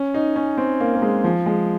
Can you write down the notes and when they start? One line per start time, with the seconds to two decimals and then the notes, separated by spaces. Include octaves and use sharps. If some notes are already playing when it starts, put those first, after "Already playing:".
Already playing: C#4
0.14 D#4
0.36 C#4
0.57 C4
0.80 A#3
0.95 A#3
1.02 G#3
1.24 F3
1.46 G#3